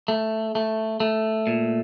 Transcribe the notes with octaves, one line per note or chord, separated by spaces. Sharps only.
A3
A3
A3
A#2